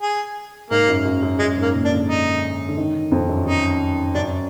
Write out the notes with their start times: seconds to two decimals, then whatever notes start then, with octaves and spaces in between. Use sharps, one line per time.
0.02 G#4
0.71 G#2 A#3
0.88 F#2
1.05 F#2
1.23 F#2
1.39 F#2 G#3
1.57 G#2
1.62 A#3
1.74 A#2
1.85 D4
1.91 D3
2.09 D#4
2.69 D3
2.77 D#3
3.12 F2
3.29 F#2
3.46 F#2 D#4
4.15 F#2 D4